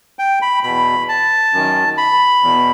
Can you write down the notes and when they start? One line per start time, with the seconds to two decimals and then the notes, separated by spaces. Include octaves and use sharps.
0.19 G5
0.42 B5
0.63 E2 B2 B5
1.09 A5
1.53 F#2 D#3
1.98 B5
2.43 E2 B2